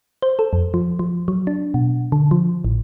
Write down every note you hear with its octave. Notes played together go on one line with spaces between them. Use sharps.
C5
A4
F2
F3
F3
F#3
D4
B2
D3
F3
A1